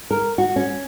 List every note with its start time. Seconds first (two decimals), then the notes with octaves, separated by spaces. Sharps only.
0.11 A#4
0.38 F#4
0.56 C#4